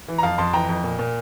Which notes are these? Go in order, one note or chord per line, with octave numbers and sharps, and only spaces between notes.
E3
A#5
F2 F5 A5
F2 A5 C6
E3 G5 A#5
F2
A#2
A#2